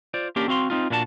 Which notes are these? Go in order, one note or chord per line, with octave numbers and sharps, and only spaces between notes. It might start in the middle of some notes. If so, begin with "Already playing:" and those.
F4 C5 D5
A#3 C#4 D4 G4 A#4
C4 F#4 F5 C6
C4 D#4 F4
A#2 A#3 D4 E4 F#4 A5